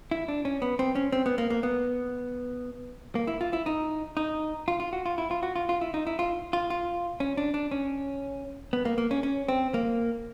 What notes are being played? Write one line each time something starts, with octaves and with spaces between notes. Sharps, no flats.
E4
D4
C#4
B3
C4
C#4
C4
B3
A#3
A#3
B3
A#3
E4
F4
E4
D#4
D#4
F4
F4
F#4
F4
E4
F4
F#4
F4
F4
E4
D#4
E4
F4
F4
F4
C#4
D4
D4
C#4
B3
A#3
A#3
C#4
C#4
C4
A#3